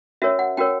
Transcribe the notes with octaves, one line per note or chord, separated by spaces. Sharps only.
C#4 F#4 A#4 C#5 E5
F#5
C#4 F#4 A#4 C#5 G5